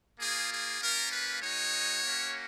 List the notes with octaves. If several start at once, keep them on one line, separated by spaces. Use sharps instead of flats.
A#3 F4 G#4
G#4
A#3 C#4 F4 A#4
B4
G#3 D#4 F#4 C#5
A#3 C#4 F#4